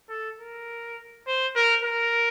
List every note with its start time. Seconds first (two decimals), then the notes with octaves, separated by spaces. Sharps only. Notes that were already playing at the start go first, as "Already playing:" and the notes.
0.09 A4
0.39 A#4
1.27 C5
1.56 A#4
1.84 A#4